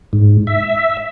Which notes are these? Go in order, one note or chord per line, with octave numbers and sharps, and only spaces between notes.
G#2
E5